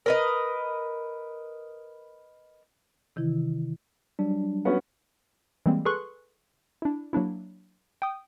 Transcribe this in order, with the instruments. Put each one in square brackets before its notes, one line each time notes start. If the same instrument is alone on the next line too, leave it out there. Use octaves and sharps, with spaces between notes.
[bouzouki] A#4 B4 D#5
[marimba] C3 D#3 E3 E4
[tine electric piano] F#3 G3 D4
[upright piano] B3 C#4 F#4
[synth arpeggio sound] E3 G3 G#3 A#3 C4
G#4 A4 B4 C6 C#6 F#6
D4 E4
F#3 A#3 D4 E4
G5 D#6